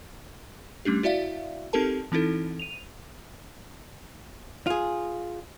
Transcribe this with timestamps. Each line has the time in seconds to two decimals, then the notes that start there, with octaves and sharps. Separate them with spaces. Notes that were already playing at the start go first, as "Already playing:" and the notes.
0.85 G3 A3 C#4 D4 G4
1.03 E4 F#4 D5 E5 F5
1.73 C4 D#4 G4 A4 A#4 A5
2.12 E3 C4 D#4 E4 A4
2.59 D#7 F7
4.67 F4 G#4